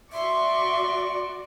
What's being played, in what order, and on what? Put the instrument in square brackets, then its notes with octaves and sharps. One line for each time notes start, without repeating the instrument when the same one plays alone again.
[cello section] F#4 D5 [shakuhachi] E5 [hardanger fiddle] C6 C#6